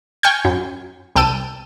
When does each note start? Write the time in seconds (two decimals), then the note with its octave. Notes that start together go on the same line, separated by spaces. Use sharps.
0.23 G5 G#5 C#6 F6 G6
0.45 F#2
1.16 C2 G5 A5 E6 D#7